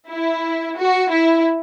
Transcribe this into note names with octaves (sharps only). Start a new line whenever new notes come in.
E4
F#4
E4